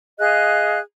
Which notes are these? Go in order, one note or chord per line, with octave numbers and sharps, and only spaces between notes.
G#4 D#5 F5 F#6